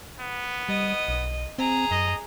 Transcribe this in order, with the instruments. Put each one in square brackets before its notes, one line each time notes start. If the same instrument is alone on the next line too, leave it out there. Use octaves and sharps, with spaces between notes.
[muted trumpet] B3
[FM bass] G3 [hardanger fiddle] D#5
[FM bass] B1
[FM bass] C4 [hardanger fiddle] G#4 A#5
[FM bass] F#2 [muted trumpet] D#5